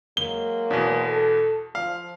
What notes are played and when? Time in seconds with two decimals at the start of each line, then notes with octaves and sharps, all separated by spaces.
0.17 F#3 G#3 A#3 G7
0.71 E2 B2
1.06 A4
1.75 F3 F5